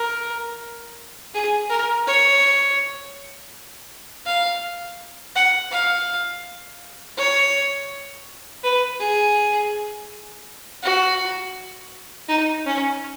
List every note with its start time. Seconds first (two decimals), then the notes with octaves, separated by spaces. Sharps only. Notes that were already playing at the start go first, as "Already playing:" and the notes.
Already playing: A#4
1.34 G#4
1.70 A#4
2.07 C#5
4.26 F5
5.35 F#5
5.72 F5
7.17 C#5
8.63 B4
9.00 G#4
10.82 F#4
12.28 D#4
12.66 C#4